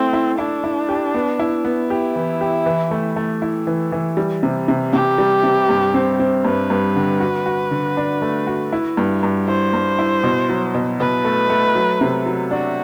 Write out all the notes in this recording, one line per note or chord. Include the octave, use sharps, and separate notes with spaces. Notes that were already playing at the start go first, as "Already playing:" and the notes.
Already playing: A3 C4 E4
E4
D4 E4
E4
G4
B3
E4
B3
E4 G4
E3
G4
E3
A3
A3
E4
E3
E3
G3
C3
C3
C3 G4
G3
C3
G2
C4
C4
G2 B4
G2
D3
F#4
F#4
D3
D4
A3
F#4
E4
G2
G2
E4 C5
G2
E4
B2
F#3
B2
B2 B4
A3
A3
F#3
C3
F#3
D4 F#4